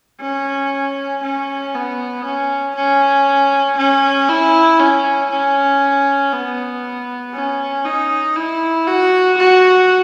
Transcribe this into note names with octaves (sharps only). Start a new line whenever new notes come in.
C#4
C#4
B3
C#4
C#4
C#4
E4
C#4
C#4
B3
C#4
D#4
E4
F#4
F#4